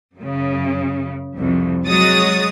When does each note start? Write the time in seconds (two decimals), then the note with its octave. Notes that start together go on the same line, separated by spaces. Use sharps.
0.17 F#2 C#3
1.37 C2 F2
1.86 F#3 G#3 F#4 C#5 D#6 A6